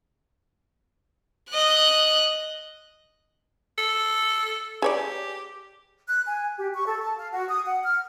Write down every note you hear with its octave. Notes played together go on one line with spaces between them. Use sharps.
D#5 F#6
A4
G4 G#4 C#5 D5
F#6
G#5
G4
C#6
A4
A5
F5
F#4
D#6
F#5
F6